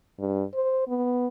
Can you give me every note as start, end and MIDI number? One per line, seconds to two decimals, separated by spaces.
0.19 0.44 43
0.54 0.84 72
0.88 1.27 59